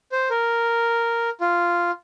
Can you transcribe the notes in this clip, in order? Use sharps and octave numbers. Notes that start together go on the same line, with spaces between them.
C5
A#4
F4